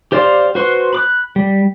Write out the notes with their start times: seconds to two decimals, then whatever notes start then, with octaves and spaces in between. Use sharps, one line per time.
0.12 G4 C5 D5 F5 C6
0.55 F#4 B4 C5 C6 C#6
0.93 B5 D6 F#6
1.36 G3